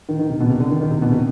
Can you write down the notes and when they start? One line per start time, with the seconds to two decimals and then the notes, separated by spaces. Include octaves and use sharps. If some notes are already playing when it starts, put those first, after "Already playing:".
0.09 D#3
0.19 D#3
0.29 C3
0.40 B2
0.50 C3
0.60 D3
0.70 D#3
0.81 D#3
0.91 C3
1.02 B2
1.12 C3